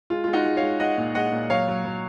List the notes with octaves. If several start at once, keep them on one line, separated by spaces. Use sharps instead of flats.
G#3 F4
G#3 F4
D#4 F#4
G#3
C#5 F5
G#3
G#3 D#5 F#5
A#2
G#3 D#5 F#5
A#2
F#3 C#5 F5
F#3
F#3